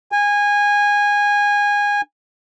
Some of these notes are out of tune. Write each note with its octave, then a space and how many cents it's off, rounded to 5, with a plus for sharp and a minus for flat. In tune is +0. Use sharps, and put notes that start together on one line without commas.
G#5 -20